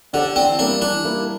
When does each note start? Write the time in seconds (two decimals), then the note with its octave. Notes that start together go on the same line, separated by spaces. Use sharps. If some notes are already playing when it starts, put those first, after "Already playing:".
0.13 D3 D4 G4 D5
0.36 E3 C4
0.59 G3 A#3 D4 E4
0.82 E3 D4
1.04 G3 A#3 E4